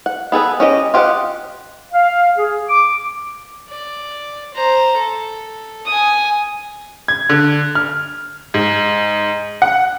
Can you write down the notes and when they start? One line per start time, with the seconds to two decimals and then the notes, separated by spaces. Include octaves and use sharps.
0.06 F#5
0.32 B3 G#4 A4 B4
0.60 C#4 G4 D#5
0.94 F4 G4 D#5 F5 F#5
1.93 F5
2.38 G#4
2.68 D6
3.70 D5
4.54 C5 A#5
4.98 A4
5.86 G#5 D#6
7.08 G#6
7.29 D3
7.75 F6
8.54 G#2
9.62 F#5